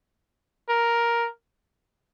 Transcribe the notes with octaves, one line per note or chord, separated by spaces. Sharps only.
A#4